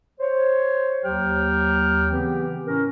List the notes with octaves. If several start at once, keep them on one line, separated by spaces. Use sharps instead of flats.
C5 C#5
D#2 F#3 G4 G5 F6
C#3 E3 B3 C4 G4
A2 C#4 A#4